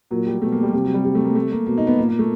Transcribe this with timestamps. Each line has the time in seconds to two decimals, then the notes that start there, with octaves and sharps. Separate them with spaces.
0.11 A#2 F#3
0.27 G3
0.41 B2 A3
0.52 A#3
0.63 G3
0.73 C3 G3
0.84 F#3
0.94 G3
1.05 G3
1.15 A3
1.25 A#3
1.35 A3
1.52 A#3
1.66 B2 A#3
1.78 D#4
1.87 B3
1.98 A#2 A#3
2.09 A#3
2.19 A3